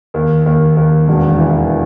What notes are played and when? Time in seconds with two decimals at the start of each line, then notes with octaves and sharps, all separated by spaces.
0.14 D#2
0.46 D#2
0.77 D#2
1.08 E1
1.39 E3